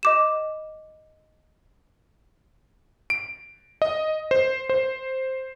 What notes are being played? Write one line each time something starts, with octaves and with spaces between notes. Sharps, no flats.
D#5 D6 E7
D7
D#5
C5
C5